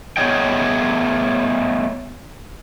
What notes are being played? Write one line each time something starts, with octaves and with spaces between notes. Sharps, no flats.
A3 B3 G#4 C#5 D#5 G5